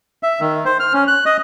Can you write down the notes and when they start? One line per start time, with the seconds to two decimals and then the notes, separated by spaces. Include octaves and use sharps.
0.23 E5
0.40 D#3
0.65 C5
0.80 F6
0.94 C#4
1.08 F#6
1.26 D#5